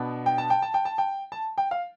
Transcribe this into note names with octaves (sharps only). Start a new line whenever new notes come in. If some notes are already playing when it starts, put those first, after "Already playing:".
Already playing: B2 B3 D4
G5
A5
G5
A5
G5
A5
G5
A5
G5
F5